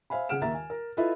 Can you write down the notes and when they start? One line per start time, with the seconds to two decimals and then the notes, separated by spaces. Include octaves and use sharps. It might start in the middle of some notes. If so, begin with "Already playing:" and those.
0.10 C5 E5 F5 G#5 B5
0.29 C#3 G#4 F#5 F6 D7 E7
0.42 D#2 D#3 E5 A#5 A6
0.54 G#5
0.70 A#4
0.97 E4 F4 A4 B4 D#5 E5